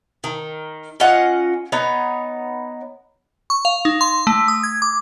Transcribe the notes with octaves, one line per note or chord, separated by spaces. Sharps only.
D#3
C#4 F4 D#5 F#5
B3 D#4 C#5
C#6
F5
D#4
C6
A3
D#6
G#6
D6